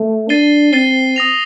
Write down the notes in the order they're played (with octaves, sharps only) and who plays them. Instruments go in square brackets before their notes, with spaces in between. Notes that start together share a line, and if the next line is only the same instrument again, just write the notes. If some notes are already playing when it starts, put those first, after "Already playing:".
Already playing: [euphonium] A3
[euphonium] D4 [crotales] A6 C7 D#7 G7
[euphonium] C4 [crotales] A6 C7 D#7 G7
[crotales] D#6 A#6 F7